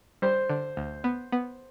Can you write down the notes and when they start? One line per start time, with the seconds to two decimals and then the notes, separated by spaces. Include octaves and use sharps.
0.22 G3 C5
0.50 D3
0.77 D2
1.04 B3
1.32 B3